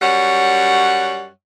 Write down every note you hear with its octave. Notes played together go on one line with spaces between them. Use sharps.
F#2 G3 C#5 F#5